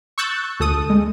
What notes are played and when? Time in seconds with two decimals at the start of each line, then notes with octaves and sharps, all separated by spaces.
0.18 C#6 E6 F#6 G6 A6
0.60 D2 A4 D#6
0.90 G#3